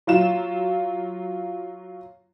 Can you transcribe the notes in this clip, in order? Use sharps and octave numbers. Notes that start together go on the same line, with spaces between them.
F#3 F4 E7